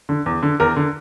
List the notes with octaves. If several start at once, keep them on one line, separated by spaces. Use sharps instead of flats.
D3
E2
D3
E2 A#4
D3